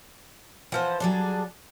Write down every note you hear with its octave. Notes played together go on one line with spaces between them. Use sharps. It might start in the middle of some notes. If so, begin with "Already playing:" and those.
E3 F3 C5 F#5
F#3 G3 D4 G#4 A4